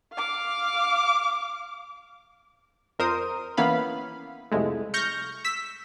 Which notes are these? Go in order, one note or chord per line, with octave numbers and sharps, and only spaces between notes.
F5 D6
F2 A#4 C5 D#6
E3 A#3 B3 C#4 F5 B5
C2 F2 G#3 A3
C#6 F6 G6 A#6
E6 B6